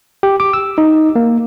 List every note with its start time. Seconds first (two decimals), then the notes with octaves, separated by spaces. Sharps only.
0.23 G4
0.40 D6
0.53 E6
0.78 D#4
1.16 A#3